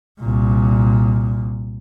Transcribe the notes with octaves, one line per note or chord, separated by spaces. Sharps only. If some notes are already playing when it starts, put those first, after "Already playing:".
C2 A#2